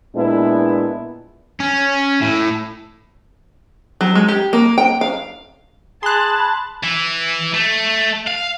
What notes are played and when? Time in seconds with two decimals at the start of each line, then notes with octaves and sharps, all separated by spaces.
0.15 A#2 G#3 B3 D4 E4
1.60 C#4
2.22 A2
4.01 F#3
4.15 G#3
4.28 G4
4.53 A#3
4.78 G5
5.01 F5
6.03 G#4 A5 B5 C6 F#6
6.84 E3
7.54 A3
8.27 F5